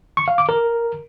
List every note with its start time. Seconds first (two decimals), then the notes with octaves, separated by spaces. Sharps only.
0.17 C#6
0.28 F5
0.38 D6
0.49 A#4